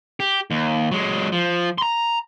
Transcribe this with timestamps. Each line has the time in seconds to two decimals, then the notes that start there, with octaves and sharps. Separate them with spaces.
0.20 G4
0.51 D#2
0.92 F#3 G#3
1.32 F3
1.78 A#5 C6